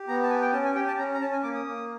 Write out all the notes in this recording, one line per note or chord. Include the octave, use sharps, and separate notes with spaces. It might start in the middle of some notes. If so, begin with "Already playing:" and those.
Already playing: G4
B3 A#5
A5
G4 G#5
G5
C#4 A5
G#5
G4 G5
A5
C#4 A#5
A#5
C#4 A5
G#5
A#3 D6
D#6
A#3